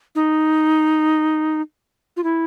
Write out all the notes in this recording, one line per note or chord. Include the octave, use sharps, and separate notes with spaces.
D#4
F4
E4